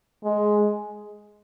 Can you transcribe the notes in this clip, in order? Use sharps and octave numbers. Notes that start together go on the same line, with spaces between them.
G#3